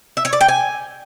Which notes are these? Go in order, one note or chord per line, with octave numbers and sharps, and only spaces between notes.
E5
C#5
D5
G5
G#5